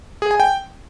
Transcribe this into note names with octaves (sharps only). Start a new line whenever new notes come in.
G#4
G#5
G5